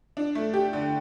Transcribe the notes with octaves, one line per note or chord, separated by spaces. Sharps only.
D4
A3
G4
D3